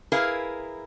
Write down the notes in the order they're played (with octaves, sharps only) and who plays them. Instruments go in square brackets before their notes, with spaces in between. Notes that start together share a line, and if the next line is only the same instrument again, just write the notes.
[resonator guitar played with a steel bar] E4 G#4 A#4 B4 F5